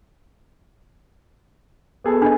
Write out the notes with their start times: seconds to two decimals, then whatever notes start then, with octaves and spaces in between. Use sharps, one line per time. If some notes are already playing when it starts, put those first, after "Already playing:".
2.04 B3 G#4 A4
2.22 D4 D#5